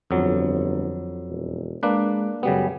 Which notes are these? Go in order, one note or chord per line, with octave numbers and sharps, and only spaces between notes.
G1 F2 F#3
E1
G#3 A#3 D4 B4
F#2 C#3 G3 B3